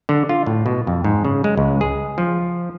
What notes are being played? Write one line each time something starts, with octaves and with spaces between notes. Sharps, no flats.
D3
F4
A2
B2
F2
G#2
C#3
G#3
C#2
G#4
F3